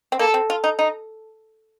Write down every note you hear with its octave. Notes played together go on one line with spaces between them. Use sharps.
C4
A#3 A4
C4
F4
D#4
D#4